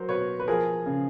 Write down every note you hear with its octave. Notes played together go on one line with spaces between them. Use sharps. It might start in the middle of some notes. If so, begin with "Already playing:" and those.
Already playing: F#3 A#4 C5
B2 B4 C#5
B4
F3 G#4 A#4
C#3